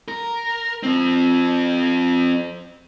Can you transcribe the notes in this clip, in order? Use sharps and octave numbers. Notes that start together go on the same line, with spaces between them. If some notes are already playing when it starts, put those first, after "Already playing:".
A#4
F3 C4